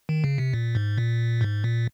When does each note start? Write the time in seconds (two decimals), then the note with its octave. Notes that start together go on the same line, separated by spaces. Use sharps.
0.09 D#3
0.24 C#3
0.38 C3
0.53 A#2
0.75 G#2
0.97 A#2
1.41 G#2
1.64 A#2